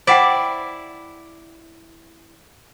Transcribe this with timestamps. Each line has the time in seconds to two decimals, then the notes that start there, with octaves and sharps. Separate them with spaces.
0.07 E4 C5 D5 F#5 G5